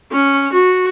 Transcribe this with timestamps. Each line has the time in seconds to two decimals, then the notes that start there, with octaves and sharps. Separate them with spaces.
0.12 C#4
0.53 F#4